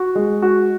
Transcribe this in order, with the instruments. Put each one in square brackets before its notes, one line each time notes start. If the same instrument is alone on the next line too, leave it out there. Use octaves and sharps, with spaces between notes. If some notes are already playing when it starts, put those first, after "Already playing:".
Already playing: [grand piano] F#4
G#3
F#4